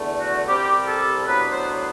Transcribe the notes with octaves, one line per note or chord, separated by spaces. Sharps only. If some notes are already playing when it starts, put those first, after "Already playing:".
Already playing: E2 D3 A3
F#4
C2 C3 G3 G4
A4
A2 F#3 B3 D4 B4
C5